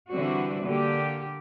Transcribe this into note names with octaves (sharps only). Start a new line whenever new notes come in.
D3 E3 G3 C4 D4 F#4
D3 A#3 G4